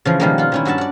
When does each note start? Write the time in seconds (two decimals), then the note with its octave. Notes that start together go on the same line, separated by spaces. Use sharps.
0.05 C#3 E3 F3
0.20 B2 D#3 F3 G3 G#3 A#3
0.38 F4 F#5
0.52 D#3 C#4 E4
0.65 G2 F#4 E5 F#5 A5
0.78 D5 F#5